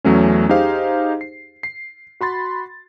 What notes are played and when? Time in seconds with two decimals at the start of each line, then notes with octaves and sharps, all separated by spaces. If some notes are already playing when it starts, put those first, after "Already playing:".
0.05 E2 F#3 A3 C#4
0.49 D#4 G4 G#4 C5 F5
1.21 C7
1.63 C7
2.21 F#4 B5 C6 A6